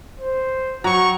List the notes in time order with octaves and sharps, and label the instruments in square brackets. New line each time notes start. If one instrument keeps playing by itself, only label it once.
[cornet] C5
[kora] F#3 [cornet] F#4 [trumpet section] G5 C#6 [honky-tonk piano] A#5